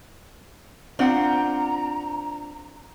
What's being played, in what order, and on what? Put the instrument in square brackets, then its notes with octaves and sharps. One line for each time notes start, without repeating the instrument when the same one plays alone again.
[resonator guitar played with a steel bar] C4 F#5 [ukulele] D4 F4 [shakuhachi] A#5